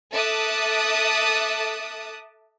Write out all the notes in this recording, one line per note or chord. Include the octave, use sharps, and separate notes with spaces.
A4 E5 A5 D6 D#6 F#6